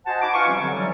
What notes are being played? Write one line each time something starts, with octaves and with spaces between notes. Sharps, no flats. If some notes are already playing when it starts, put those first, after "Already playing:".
F#4 C5 D#5 F#5 G#5 A5
D#4 B5 C#6 D6
F4 B4 F5 G#5 C#6
C3 F3 G3 C4 C#4
D3 F#3
E3 F#3 G3